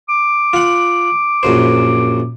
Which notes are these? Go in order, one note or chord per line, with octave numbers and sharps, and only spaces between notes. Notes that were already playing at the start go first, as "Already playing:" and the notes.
D6
F4 F#5
A#1 F#2 C5